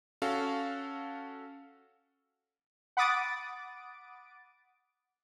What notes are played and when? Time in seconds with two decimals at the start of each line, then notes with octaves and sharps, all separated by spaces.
0.22 C#4 F#4 A4 F5
2.97 F#5 B5 D6 D#6 A6 D7